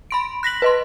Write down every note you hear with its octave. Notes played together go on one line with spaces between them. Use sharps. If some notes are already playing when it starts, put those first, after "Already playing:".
B5 C6 D7
F#6 A#6 B6 F#7
B4 D#5 C6